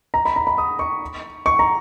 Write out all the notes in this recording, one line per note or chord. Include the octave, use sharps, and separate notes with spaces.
A#5
B5
A#5
B5
D#6
C#6
C#6
A#5